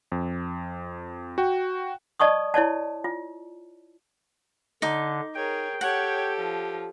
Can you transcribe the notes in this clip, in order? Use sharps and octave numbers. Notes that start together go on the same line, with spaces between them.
F2
F#4 G5
D5 D#5 A5 C#6 D#6
E4 C#5 D5 A5
F4
D3 D#4 D6
G#4 A#4 C#5 G5
G4 A4 C#5 F#5
F3